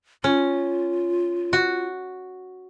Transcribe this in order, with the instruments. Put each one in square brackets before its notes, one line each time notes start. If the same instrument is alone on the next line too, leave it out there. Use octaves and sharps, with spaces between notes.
[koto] C#4 [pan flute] F4
[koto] F#4